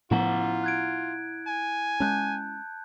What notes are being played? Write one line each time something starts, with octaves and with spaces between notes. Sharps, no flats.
A2 F3 B3 E4 F4 F#5 A#5
F#6 G#6 D7
G#5
G#3 C#4 A5 F#6 G6